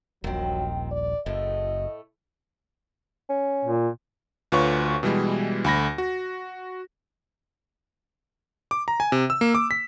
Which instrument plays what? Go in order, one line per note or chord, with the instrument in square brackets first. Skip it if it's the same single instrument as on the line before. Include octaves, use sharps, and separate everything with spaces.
[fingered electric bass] D#1 A#1 [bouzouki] D#3 C4 [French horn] F#3
[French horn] D5
[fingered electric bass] F#1 [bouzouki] A2 A3 [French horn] D#5
[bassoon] C#4
[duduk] A#2
[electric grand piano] D2 F4 B4 C#5 C#6
B2 E3 G3 G#3
D2 B5 A#6
F#4
D6
A#5
G#5
C3
E6
A#3
D6
B6